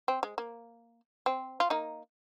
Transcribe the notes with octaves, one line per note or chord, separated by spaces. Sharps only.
C4
G#3
A#3
C4
F4
A#3 D#4